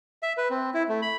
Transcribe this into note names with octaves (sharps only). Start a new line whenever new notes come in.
E5
B4
C4
E4
A3
B5